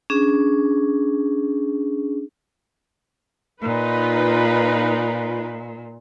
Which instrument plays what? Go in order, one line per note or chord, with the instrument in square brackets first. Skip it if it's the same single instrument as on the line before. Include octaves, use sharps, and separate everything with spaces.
[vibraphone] C#4 D4 G#4
[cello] A#2 [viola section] D#4 F4 B4